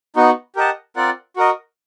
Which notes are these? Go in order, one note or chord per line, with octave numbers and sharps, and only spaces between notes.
B3 D#4 F#4
G4 A#4 D#5 F#5 A5
C4 F4 A#4 D5 F#5
F#4 A#4 D#5